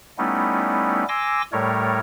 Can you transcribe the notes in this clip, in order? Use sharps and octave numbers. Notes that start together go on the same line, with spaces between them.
G3 A3 B3 C#4 D#4 E4
G#5 C6 D6 E6 A#6
A2 G3 A3 A#4 C#5